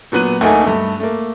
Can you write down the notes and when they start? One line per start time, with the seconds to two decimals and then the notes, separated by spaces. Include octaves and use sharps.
0.12 A#2 F#3 B3 F#6 D#7
0.41 D2 A3 A#3 D#4 G#5
0.64 G2 A3
1.00 A3 A#3